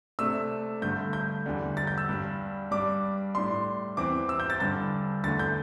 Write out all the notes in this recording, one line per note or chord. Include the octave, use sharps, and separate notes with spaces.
C3 A3 D4 E6
G2 D3 A3 G6
G6
E2 D3 G3
A6
G6
E6
G2 G3 D4
G2 G3 D4 D6
A2 G3 D4 C6
E2 E3 C4 D6
E6
G6
A6
G2 D3 G3 D4 A6
E2 D3 A3 A6
G6